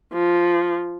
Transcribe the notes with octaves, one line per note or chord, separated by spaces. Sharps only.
F3